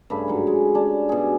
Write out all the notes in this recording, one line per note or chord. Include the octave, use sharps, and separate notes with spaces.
G2 C#3 A3 B5
G#2 F#3
G#3
C#4 D4
B2 G#4